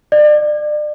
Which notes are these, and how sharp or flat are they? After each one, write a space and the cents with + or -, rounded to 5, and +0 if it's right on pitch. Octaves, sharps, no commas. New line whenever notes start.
D5 +35